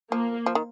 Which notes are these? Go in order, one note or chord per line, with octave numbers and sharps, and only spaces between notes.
F3 A#3
F3
D#3